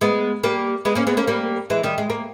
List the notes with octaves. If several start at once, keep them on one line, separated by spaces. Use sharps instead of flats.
G#3 B3
G3 A#3
G#3 B3
A#3 C#4
G#3 B3
A#3 C#4
G3 A#3
E3 G#3
D#3 G3
G#3
A#3